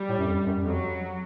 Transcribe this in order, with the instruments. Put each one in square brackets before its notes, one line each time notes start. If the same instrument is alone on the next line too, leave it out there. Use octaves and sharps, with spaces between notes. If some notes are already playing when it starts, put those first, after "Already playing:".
Already playing: [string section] G3
[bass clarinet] A2
F#2
F2
F#2
[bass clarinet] F2 [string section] F#3